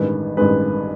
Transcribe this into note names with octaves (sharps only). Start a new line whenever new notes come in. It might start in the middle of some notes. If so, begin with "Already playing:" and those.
Already playing: A1 G2 D#3 G#3 B4
A1 G2 D#3 G#3 B4